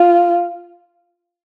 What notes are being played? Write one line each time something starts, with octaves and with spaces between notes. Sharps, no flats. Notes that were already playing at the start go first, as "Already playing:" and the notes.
Already playing: F4